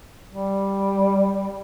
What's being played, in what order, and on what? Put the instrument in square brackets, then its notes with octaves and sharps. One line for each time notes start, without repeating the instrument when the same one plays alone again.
[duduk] G3